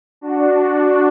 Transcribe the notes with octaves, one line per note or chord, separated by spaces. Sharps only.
D4 F#4